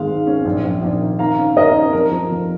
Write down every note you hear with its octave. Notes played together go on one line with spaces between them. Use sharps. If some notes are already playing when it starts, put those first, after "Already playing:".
Already playing: G#1 G#3 F5
G#2
C#4
A#1
A#1
A#1
D#3
D#3 F5 A#5
C#4
D#2 A#4 D#5
C#4
F2 A#4
F3
F1